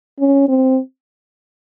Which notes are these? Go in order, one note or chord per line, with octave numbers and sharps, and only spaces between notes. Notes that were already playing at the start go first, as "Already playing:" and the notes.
C#4
C4